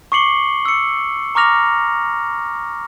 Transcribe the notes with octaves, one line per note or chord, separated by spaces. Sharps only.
C#6 D6 C7 C#7 F#7 G7
E6 C#7
A#5 C#6 D6 F6 A#6 F7